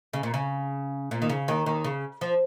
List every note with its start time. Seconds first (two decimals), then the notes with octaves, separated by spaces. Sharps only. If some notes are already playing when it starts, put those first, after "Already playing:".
0.13 C#3
0.23 A#2
0.34 C#3
1.11 A#2
1.22 D#3
1.29 C#3
1.48 D#2 D#3
1.66 D#2 D#3
1.84 C#3
2.21 F3